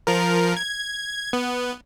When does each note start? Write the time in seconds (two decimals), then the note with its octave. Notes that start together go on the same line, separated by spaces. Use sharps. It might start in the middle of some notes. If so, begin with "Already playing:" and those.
0.07 F3 A#4
0.57 G#6
1.33 B3